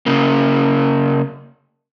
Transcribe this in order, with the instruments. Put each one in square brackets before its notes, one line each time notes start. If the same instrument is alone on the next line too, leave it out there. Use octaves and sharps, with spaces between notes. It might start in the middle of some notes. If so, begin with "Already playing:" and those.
[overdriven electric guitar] C#3 A#3